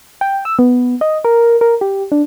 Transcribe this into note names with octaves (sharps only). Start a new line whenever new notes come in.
G5
E6
B3
D#5
A#4
A#4
G4
D4